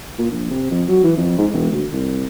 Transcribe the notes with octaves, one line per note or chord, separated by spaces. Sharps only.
A#2
A#1
C3
F2
F#3
E3
F2
G#2
E1
D2
C2